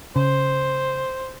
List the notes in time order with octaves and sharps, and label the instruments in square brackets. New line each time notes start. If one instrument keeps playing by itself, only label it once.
[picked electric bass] C#3 [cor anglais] C5